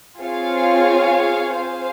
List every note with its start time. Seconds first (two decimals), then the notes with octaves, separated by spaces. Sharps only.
0.21 C4 F4 G#4 C#5 F5
1.57 G#4 C5 F5